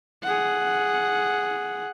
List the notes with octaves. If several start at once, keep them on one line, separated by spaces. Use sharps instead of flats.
G#4 F#5